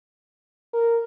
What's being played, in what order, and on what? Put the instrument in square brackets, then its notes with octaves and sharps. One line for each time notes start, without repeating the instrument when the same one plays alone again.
[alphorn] A#4